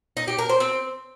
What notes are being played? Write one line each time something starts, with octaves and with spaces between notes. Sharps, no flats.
D#4
G4
A#4
C5
C4